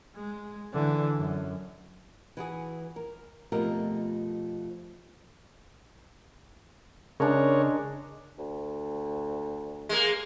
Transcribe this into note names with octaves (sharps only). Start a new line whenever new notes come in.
G#3
D3 E3
F#2
E3 F#4 G#4
A#4
F2 B2 F3 A3 G4 A#4
C#3 G#3 D4 A#4 C#5
D2
G#3 A#3